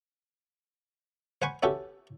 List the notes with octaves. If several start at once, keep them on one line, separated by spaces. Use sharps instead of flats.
C5 F#5 G#5 B5 C#6
B3 C#4 E4 F#4 G4 A4